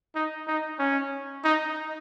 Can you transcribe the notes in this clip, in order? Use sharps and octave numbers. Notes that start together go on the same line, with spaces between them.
D#4
D#4
C#4
D#4